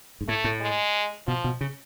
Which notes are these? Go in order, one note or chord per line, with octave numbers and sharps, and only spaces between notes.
G#2
A2 A3
A2
G#3
B2 F3
B2
C#3